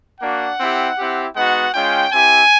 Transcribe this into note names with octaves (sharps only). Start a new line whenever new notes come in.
A#3 D4 F#4 F#5
C4 E4 G4
C4 E4 G4
G#3 B3 D#4 F#4 F#5
G#3 C#4 F4 G5
C4 E4 G4 G#5